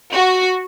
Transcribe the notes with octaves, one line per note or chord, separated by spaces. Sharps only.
F#4